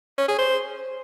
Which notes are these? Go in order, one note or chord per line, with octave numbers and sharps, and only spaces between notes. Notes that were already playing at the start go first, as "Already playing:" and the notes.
C#4
G#4
C5